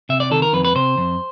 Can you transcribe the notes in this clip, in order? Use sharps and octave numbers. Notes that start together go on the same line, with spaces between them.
C3 E5
D5
D#3 A4
A#4
F2 B4
B4
C3 C5
F2